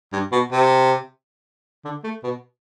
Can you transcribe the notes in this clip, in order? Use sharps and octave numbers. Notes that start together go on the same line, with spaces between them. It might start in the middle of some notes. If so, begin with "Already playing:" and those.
G2
B2
C3
D3
A3
B2